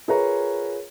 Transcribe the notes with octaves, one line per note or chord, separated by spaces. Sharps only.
F4 G#4 A#4 B4 C#5 A#5